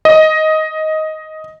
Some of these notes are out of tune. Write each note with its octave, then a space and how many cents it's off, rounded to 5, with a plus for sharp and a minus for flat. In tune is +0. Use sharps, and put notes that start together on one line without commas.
D#5 +10